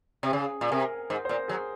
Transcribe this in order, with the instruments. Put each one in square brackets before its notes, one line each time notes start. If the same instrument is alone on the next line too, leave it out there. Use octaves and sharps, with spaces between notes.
[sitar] C3
[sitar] C#3 [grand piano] G#4
[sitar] A#2
[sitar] C3 [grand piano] A#4
[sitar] G#2 [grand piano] C5
[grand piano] C5
[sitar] A#2 [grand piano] A#4
[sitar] F#3 [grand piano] G#4